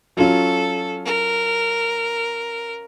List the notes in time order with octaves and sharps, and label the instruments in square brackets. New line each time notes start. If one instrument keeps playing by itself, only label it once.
[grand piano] F#3 C#4 F4 [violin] A4
[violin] A#4